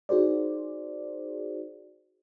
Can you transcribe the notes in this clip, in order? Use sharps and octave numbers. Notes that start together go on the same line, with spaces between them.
D#4 F#4 G#4 C5 D5